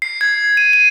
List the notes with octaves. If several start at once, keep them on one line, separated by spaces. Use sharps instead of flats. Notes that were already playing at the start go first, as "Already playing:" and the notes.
C7
G#6
D#7
D#7